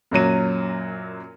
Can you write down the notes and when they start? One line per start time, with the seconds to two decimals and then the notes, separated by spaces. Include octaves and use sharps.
0.11 F#2 A#2 F#3 D#7